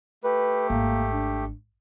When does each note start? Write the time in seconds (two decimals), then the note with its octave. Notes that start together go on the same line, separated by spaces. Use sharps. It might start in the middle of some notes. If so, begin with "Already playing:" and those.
0.24 A3 G4 B4
0.70 G#1 A#3
1.13 D4